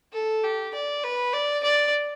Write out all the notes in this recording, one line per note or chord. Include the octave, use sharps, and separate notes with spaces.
A4
G4
D5
B4
D5
D5